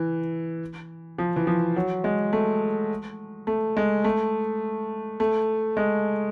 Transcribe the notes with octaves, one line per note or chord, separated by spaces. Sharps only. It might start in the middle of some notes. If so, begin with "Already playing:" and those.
Already playing: E3
F3
E3
F3
F#3
G#3
A3
A3
G#3
A3
A3
G#3